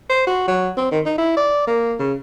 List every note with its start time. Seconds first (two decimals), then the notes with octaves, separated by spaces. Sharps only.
0.09 C5
0.27 F#4
0.47 F#3
0.77 C4
0.91 D#3
1.05 D#4
1.18 E4
1.37 D5
1.67 A#3
1.99 C#3